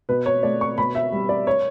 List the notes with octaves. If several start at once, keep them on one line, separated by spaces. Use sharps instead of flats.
B2 B4
C#5
A3 D5
C#6
B2 B5
E5
G3
D5
C#5